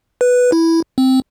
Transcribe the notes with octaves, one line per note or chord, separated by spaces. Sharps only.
B4
E4
C4